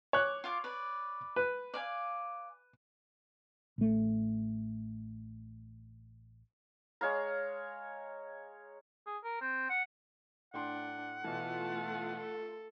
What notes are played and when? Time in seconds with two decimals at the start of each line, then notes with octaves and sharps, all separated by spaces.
0.13 C#5 D6 F#6
0.44 F4 F5 D6
0.64 B4 D5
1.36 B4
1.74 D5 F5 G#5
3.78 A1 A3
7.01 G#3 C#5 F5 A#5
9.07 G#4
9.24 A#4
9.41 C4
9.70 F#5
10.54 A2 D4 F#5 G5 C6
11.24 B2 E3 A3 F4 A5
12.16 A4